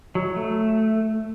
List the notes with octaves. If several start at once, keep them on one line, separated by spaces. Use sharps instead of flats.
F#3
A3